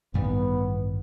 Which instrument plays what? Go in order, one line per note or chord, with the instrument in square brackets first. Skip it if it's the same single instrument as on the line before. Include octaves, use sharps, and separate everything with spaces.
[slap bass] A1 G2 D#3 G3 [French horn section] B3